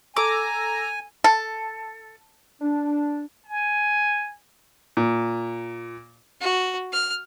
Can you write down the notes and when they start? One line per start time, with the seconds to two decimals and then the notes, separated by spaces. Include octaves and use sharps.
0.16 A4 G#5 A#5 D6 E6
1.24 A4
2.61 D4
3.45 G#5
4.97 A#2
6.41 F#4
6.92 F6